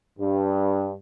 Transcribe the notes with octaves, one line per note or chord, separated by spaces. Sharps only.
G2